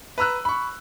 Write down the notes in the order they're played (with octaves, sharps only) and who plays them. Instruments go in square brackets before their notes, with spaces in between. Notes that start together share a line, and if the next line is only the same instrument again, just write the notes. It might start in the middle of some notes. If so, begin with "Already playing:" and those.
[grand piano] B4 A#5 E6 F#6
B5 C#6